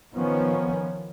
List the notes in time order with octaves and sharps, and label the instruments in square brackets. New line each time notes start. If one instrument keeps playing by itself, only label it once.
[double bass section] D#3 F3 B3 C#4